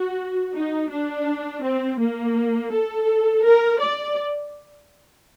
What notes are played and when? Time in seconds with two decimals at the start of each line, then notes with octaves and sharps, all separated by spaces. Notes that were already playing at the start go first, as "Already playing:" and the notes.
Already playing: F#4
0.54 D#4
0.90 D4
1.63 C4
1.98 A#3
2.71 A4
3.43 A#4
3.80 D5